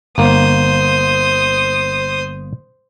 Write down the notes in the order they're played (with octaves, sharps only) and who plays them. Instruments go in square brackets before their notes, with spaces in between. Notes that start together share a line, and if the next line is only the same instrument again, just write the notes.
[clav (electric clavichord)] G1 A#3 [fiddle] C5 D#6